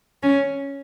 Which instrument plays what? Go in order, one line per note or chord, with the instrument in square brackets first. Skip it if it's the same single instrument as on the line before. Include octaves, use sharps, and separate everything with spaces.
[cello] C#4